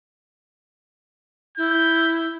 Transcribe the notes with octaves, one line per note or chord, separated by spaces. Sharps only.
E4 G6